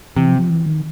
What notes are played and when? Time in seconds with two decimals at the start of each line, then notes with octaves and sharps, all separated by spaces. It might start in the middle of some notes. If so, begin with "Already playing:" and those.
0.17 C3 E3
0.28 F3
0.39 F3
0.50 E3
0.66 D#3